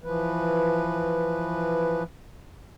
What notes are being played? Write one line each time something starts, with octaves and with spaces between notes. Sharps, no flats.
E3 F3 B4